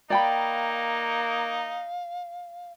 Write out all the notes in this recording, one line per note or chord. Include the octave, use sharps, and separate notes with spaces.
A#3 D#4 D5 F5 G5 B5